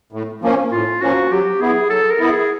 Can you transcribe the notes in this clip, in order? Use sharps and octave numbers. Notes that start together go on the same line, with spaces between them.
A2
F3 A#3 C#4
A2 F4
F3 A#3 C#4 F#4
F#3 G4
B3 E4 G#4
F#3 A4
A#4
B3 E4
G#4